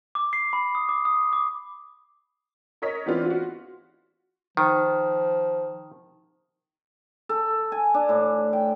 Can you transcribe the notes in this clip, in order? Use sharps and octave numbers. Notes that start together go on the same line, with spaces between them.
D6
C7
B5
D#6
D6
D#6
D6
A#4 C#5 D#5 B6
E3 B3 C4 D4 F4
F4 F#4
D#3 F3
A4
G#5
D4
A2
G5